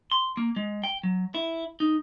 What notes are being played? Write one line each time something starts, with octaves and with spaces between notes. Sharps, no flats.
C6
A#3
G#3
G5
F#3
E4
D#4